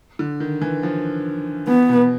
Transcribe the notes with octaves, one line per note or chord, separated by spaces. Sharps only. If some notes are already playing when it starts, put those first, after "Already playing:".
D3
D#3
E3
F3
E3 B3
B2